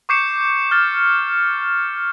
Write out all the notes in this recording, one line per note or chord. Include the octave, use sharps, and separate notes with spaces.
C#6 D6 G6 C7 C#7 E7
F6 A6